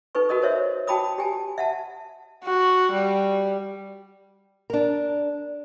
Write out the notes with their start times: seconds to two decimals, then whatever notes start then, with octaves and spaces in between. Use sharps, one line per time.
0.15 D#4 A4 B4 C#6
0.29 F#4 A4 A#4 D#5 D#6
0.42 A#4 C5 C#5 E5
0.87 F#4 G5 A5 B5 D6 D#6
1.18 G4 G#5 A5
1.58 E5 F#5 A5
2.44 F#4
2.92 G3
4.70 D4 A#4